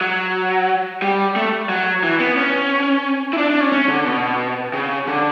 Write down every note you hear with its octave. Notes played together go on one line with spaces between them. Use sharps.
F#3
G3
A3
F#3
E3
B3
C#4
E4
D4
D4
C#4
C#4
D3
B2
C#3
D3